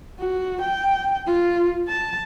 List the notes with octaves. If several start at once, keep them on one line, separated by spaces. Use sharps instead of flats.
F#4
G5
F4
A5